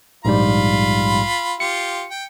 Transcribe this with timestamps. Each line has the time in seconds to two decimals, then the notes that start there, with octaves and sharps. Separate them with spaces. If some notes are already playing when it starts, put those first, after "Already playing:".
0.25 A#1 G#2 G3 F4 B5
1.60 F4 G4 C#7
2.10 G5